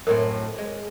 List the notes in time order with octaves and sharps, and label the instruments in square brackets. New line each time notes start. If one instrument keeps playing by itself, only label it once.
[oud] F#2 A2 C4 [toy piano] A#4 D#5
[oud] G#3